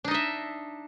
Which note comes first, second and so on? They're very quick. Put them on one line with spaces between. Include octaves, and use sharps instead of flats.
D4 D#4 D#5 E5